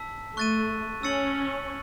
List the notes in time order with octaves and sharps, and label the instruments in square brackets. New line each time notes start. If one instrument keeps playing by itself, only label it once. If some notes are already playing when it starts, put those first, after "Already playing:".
Already playing: [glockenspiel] A5 E6 B6
[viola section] A3 [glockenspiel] C#6 F#6 A6 D#7
[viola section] C#4 [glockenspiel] E6 A6 C#7 F#7